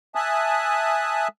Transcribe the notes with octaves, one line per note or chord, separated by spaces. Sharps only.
E5 G#5 A5 D#6 F#6